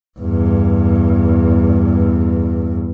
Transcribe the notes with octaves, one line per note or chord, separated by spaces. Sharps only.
E2 G2